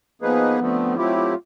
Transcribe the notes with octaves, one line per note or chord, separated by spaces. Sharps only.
F3 A#3 B3 D#4 G#4 B4
D3 F3 A3 C4
F#3 A3 C4 E4 F4 G4
F4